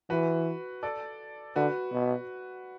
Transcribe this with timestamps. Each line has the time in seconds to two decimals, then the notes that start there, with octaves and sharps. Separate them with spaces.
0.10 E3 F#4 B4
0.83 A4 D5
1.56 D3 F#4 B4
1.93 B2